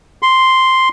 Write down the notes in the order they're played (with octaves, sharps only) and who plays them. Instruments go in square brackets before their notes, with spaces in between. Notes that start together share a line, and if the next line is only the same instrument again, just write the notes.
[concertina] C6